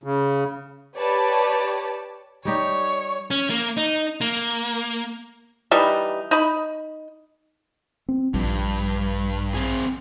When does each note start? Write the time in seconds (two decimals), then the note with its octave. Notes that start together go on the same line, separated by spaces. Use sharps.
0.04 C#3
0.96 G4 B4 C#5 D5 A5
2.45 G3 D#4 G4 C#5
3.31 C#4
3.50 A#3
3.77 D#4
4.21 A#3
5.71 E3 G3 D#4
6.31 D#4 B5
8.08 C4
8.34 A#1 G2
9.54 C4 G#4